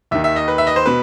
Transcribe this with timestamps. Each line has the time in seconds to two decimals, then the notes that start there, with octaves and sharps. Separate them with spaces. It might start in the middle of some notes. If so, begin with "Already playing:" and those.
0.11 D#2 D#3 E5
0.24 E5
0.36 D#5
0.48 B4
0.58 E5
0.67 D#5
0.76 C5
0.86 B2 B4